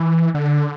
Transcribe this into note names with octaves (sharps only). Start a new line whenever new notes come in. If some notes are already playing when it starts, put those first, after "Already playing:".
Already playing: E3
D3